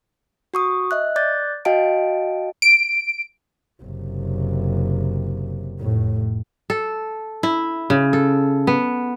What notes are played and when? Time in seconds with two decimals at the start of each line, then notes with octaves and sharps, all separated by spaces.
0.54 F#4 C#6 D#6
0.91 D#5 E5 F#6
1.16 D5 D6 F#6 G6 A6
1.65 F#4 D#5 F5 G5 A5 D7
2.62 D7
3.83 F#1 C3
5.80 F1 A2
6.70 A4
7.43 E4
7.90 C#3
8.13 A4
8.67 B3